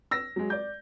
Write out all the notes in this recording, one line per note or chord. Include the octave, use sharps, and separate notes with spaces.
E6 A#6
F#3 G#3
D5 G6